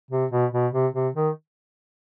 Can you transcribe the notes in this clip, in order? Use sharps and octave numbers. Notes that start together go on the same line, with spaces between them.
C3
B2
B2
C3
C3
D#3